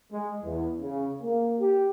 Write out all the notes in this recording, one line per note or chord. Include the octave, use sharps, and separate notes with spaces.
G#3
E2
C#3
A#3
G4